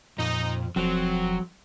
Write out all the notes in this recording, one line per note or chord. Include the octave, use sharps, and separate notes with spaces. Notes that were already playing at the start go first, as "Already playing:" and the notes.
F2 A#2 D#4
E1 F2 F#3 C4 F#4